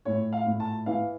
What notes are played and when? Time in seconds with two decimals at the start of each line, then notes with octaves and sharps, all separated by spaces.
0.05 A2 C#5
0.33 F5
0.46 A2
0.60 A5
0.86 E3 F5